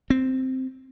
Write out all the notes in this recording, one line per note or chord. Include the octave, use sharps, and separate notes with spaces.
C4